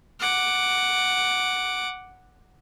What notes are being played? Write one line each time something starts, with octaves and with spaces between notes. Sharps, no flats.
F#5 D6